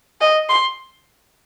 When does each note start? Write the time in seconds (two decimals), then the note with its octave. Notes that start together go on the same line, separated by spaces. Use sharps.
0.21 D#5
0.49 C6